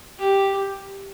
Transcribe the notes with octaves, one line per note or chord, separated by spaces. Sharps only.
G4